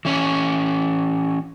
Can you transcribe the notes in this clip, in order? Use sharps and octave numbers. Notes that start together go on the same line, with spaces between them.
E3 C#4